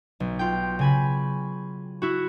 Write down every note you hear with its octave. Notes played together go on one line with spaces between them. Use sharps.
B1
F4 G5
C#3 G#5 B5
E4 F#4